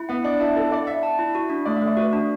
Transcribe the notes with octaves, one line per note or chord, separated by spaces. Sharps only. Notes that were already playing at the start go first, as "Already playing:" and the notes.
Already playing: E4
B3 F#5
D4 D5
E4 A5
E4 A4
D5 F#5
D5 E5
A5
E4
F#4
D4
A3 D5
E5
A3
D5
F#4 B4
D4